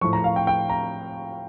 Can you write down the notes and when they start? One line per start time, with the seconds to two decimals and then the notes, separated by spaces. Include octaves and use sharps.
0.01 A2 F3 C#6
0.13 A#5
0.24 F5
0.36 G5
0.47 G5
0.69 A#5